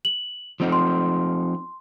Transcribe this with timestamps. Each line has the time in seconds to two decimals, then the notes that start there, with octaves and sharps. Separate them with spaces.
0.05 F#7
0.60 F3 C4 D#4
0.72 C6